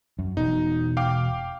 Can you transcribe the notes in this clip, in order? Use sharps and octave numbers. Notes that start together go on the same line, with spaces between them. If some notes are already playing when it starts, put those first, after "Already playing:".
F#2
E1 B2 D#4
F5 G5 D6